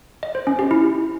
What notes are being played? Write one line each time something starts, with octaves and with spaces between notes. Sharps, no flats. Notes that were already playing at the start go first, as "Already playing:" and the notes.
D#5
C5
C#4
G4
E4